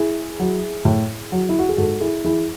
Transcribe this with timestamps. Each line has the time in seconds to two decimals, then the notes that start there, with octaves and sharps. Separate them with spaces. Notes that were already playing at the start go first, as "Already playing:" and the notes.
Already playing: E4 G#4
0.40 F#3
0.85 A2
1.32 F#3
1.49 E4
1.59 F#4
1.69 G#4
1.77 G#2 F#4 A4
2.00 E4 G#4
2.24 E3 E4 G#4